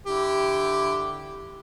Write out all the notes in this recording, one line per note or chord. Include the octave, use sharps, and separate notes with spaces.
D3 E4 G4